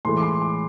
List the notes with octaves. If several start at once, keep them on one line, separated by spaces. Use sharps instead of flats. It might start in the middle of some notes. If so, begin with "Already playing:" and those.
A2 E3 G#3 C6
D6
C6
D6